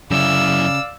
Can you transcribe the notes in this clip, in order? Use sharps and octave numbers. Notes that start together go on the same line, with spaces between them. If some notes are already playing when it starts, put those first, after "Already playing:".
F#2 C#3 E4 D5 F5 E6